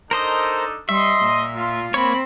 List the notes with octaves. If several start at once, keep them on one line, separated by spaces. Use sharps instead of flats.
D4 D#4 A4 A#4 C5 D#5
G3 D#5 E5 C6
A#2
F4
A#3 C4 C#5 B5